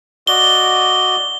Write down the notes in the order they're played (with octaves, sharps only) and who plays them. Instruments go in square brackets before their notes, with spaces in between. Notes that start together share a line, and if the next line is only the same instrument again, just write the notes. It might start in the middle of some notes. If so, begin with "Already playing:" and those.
[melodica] F#4 D5 D#5 [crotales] G7